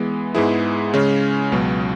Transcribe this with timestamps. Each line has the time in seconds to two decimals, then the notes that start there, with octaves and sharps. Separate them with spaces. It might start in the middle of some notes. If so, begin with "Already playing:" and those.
Already playing: E3 G#3 B3
0.35 G#2 G#3 B3 E4 G#4
0.94 C#3 G#3 C#4
1.52 C#2 B2 F#3